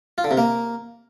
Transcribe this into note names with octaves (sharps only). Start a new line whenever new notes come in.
F4
D3
C3
A#3